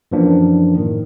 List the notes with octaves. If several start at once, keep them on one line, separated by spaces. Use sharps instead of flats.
F#2 E3 F3 A#3 D4
A2 D#3